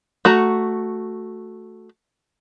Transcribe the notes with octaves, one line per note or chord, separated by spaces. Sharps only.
A3 F#4 A#5